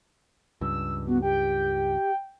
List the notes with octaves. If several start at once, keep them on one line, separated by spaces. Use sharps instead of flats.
C#2 G2 E6
B3 F#4
G4 G5